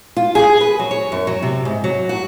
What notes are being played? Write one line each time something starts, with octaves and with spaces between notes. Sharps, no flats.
F4
G#4
B4
F#3
C#5
F#2
F#3
C3
G#2
F#3
F#4